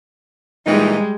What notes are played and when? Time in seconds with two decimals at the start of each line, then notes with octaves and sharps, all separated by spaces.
0.66 A#2 E3 G3 G#3 D#4